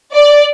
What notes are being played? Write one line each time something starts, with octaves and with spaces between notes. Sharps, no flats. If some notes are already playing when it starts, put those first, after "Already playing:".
D5